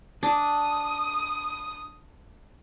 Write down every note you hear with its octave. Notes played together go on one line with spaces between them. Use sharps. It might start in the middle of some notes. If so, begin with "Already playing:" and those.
D4 D#6